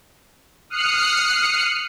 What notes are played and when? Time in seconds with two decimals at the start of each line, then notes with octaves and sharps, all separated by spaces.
0.70 D#6 F6 F#6 C7 C#7